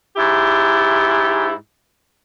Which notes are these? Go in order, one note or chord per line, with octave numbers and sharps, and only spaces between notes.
G#2 E4 G4